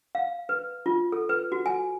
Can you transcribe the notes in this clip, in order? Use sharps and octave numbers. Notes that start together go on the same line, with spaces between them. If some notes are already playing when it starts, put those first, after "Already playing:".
F5
B4
F4
A4
B4
F#4
G#5